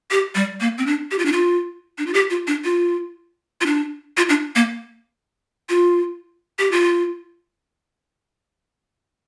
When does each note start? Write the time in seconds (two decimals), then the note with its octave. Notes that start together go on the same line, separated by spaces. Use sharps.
0.11 G4
0.35 G3
0.61 A#3
0.78 C4
0.86 D4
1.11 G4
1.19 F4
1.25 D4
1.32 F4
1.98 D4
2.07 F4
2.14 G4
2.30 F4
2.47 D4
2.64 F4
3.61 F4
3.66 D4
4.17 F4
4.29 D4
4.56 A#3
5.69 F4
6.59 G4
6.72 F4